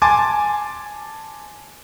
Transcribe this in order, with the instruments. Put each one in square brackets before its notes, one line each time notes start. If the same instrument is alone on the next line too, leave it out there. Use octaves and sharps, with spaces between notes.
[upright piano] G#5 A5 C6 D6 A6